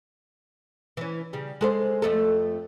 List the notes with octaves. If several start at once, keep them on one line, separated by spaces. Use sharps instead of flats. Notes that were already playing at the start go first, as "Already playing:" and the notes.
E3 C#4
C#3 G3
G#3 A4 C5
F2 A3 A4